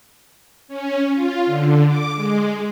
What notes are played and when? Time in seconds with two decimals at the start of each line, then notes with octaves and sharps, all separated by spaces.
0.68 C#4
1.14 F4
1.46 D3
1.86 D6
2.15 G#3